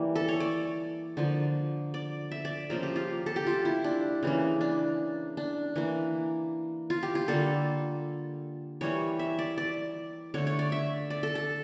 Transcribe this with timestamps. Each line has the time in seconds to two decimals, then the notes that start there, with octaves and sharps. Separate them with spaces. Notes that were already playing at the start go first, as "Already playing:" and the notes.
Already playing: E3 G3 A#3
0.15 A4
0.28 C#5
0.40 D5
1.17 D3 F3 A#3
1.94 D5
2.31 E5
2.45 D5
2.70 C#3 F3 A#3 A#4
2.83 G4
2.96 F4
3.26 A4
3.36 G4
3.47 F4
3.65 E4
3.84 D4
4.23 C#3 E3 A#3
4.61 D4
5.37 D4
5.76 E3 A#3
6.90 F4
7.03 G4
7.15 F4
7.28 D3 G3 A#3 A4
8.81 E3 G3 A#3 C#5
9.19 E5
9.39 D5
9.58 D5
10.34 D3 A3 C#5
10.47 C#5
10.59 D5
10.72 E5
11.10 D5
11.23 A4
11.35 A4